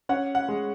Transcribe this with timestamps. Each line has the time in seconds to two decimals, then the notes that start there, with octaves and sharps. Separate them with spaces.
0.09 C#4 F#5
0.35 F#5
0.48 G#3